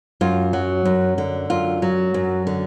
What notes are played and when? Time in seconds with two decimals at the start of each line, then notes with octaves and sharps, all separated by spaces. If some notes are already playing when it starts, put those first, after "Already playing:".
0.21 F#2 F4
0.53 F#3
0.85 F#2
1.18 D3
1.50 F#2 F4
1.82 F#3
2.14 F#2
2.47 D3